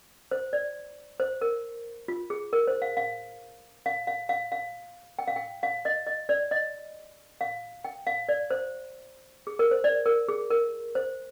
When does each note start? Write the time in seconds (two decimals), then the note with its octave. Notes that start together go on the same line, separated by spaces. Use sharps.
0.31 C5
0.53 D5
1.20 C5
1.41 A#4
2.08 F4
2.30 G#4
2.53 A#4
2.67 C5
2.82 F5
2.97 F5
3.86 F5
4.07 F5
4.29 F5
4.52 F5
5.19 G5
5.28 F5
5.36 G5
5.63 F5
5.85 D#5
6.07 D#5
6.29 D5
6.51 D#5
7.41 F5
7.84 G5
8.07 F5
8.29 D5
8.50 C5
9.47 G#4
9.59 A#4
9.71 C5
9.84 D5
10.06 A#4
10.28 G#4
10.51 A#4
10.95 C5